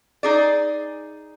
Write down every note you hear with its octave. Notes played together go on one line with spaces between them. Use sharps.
D#4 G#4 D5